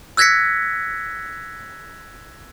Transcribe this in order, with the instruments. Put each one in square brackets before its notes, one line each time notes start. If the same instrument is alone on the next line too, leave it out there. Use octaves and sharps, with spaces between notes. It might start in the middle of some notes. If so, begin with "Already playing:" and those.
[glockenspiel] E6 F#6 G#6 A#6 B6 C#7